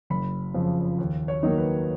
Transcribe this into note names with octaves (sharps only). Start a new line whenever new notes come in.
F#1 B5
F2 C#3 F3
D#2
C#5
D#3 F#3 A#3 D#4
B4